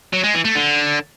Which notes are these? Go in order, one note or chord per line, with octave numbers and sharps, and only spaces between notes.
F#3
G#3
E3
A3
D3